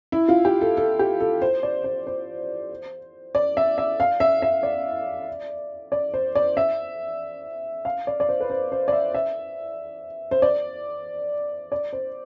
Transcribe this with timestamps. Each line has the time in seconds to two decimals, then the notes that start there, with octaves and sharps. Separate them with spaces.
0.12 E4
0.28 F4
0.45 G4
0.61 A4
0.77 A4
0.99 G4
1.21 A4
1.42 C5
1.63 D5
1.84 C5
2.07 C5
3.35 D5
3.57 E5
3.78 E5
4.00 F5
4.20 E5
4.42 E5
4.63 D5
5.92 D5
6.14 C5
6.35 D5
6.57 E5
7.85 F5
8.07 D5
8.20 D5
8.29 C5
8.40 B4
8.50 C5
8.72 C5
8.88 D5
8.92 E5
9.14 E5
10.31 C5
10.42 D5
11.72 D5
11.93 C5